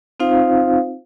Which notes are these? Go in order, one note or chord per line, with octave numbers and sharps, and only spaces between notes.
C4 D#4 F4 C5 F5